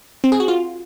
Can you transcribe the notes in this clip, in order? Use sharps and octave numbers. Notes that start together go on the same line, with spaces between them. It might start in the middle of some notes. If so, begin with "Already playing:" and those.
C4
G#4
F#4
F4